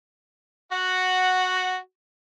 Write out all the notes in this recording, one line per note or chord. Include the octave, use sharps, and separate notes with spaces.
F#4 F#5